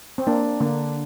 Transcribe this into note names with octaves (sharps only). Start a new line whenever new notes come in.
C4
A#3 D4
D3 A#3